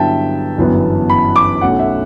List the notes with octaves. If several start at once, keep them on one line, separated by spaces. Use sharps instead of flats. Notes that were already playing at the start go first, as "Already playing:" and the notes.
Already playing: G2 D3 F#3 B3 E4 E5 G5 A5
G1 F#2 E3 B3
B5
D6
B1 B2 A3 C#4 F#5
E5